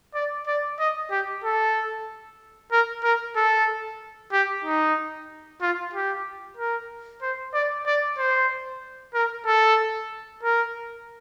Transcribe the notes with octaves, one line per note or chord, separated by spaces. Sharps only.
D5
D5
D#5
G4
A4
A#4
A#4
A4
G4
D#4
F4
G4
A#4
C5
D5
D5
C5
A#4
A4
A#4